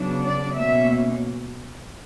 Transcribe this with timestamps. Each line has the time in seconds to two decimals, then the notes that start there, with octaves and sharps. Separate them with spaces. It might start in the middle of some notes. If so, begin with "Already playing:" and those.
Already playing: C#3 F#3 B3 D4
0.23 D5
0.57 B2 A#3 C#4 E5